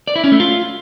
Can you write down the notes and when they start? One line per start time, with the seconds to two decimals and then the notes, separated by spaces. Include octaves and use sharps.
0.08 D5
0.16 E4
0.24 C#4
0.32 A3
0.40 F4